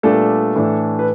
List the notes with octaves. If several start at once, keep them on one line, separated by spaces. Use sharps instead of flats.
A#2 G3 A3 B3 D4 A4
A2 E3 A3 D4
B4